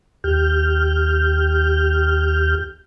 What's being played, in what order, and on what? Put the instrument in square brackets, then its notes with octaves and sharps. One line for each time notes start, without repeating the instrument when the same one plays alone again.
[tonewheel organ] D#2 G4 F6 G6